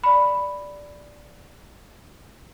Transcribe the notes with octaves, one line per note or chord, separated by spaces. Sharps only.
D5 B5